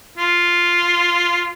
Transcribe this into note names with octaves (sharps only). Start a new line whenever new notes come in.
F4